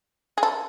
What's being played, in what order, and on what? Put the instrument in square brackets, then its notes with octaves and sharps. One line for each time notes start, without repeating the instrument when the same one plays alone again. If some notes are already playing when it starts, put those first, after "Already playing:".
[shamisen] G#4
A4